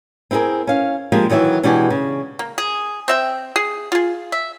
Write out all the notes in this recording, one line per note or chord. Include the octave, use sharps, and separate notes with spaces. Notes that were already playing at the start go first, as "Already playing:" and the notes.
C4 E4 G4 G#4 A#4
C#4 F5
F3 G#3 A#3 D4 G4
D#3 E3 F#3 C#5 E5
B2 E3 G#3 D4 F#4 G4
C#3
A#3
G#4
C4 E5 G5
G#4
F4 G#4
E5